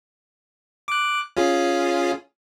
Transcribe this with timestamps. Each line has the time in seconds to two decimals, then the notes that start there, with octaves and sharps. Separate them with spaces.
0.88 D6 F#6
1.37 C#4 F4 G#4